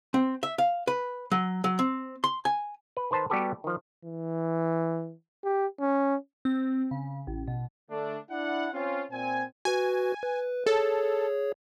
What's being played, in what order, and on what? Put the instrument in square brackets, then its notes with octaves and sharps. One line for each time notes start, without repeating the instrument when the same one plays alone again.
[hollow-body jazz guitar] C4
E5
F5
B4
F#3
F#3
C4
C6
G#5
[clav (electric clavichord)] B4
D#3 B4 C5 A5 A#5
G3 B3 F#4 G4 A4 B4
D#3 F3
[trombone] E3
G4
C#4
[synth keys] C4
C#3
A1
B2
[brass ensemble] D3 A3 D4
D4 E4 F#5
C4 C#4 F4
A#2 C4 G#5
[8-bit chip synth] F#4 B4 [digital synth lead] G#5
[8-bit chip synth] B4
[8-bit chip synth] G#4 C#5 [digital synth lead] A4